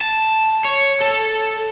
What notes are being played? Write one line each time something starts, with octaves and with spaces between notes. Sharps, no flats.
A5
C#5
A4